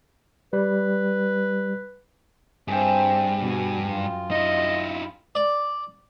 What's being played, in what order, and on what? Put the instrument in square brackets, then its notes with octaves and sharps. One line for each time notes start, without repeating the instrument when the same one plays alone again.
[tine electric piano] G3 [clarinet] B4
[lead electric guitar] G2 [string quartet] C4 C5 E5 [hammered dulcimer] G#4 G5
[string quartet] B2 F#4 G#5
F#2 F4
[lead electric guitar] D#4 E4 [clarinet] D#5
[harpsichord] D5